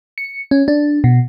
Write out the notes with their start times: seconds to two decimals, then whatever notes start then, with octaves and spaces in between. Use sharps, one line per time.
0.18 C#7
0.51 C#4
0.68 D4
1.04 B2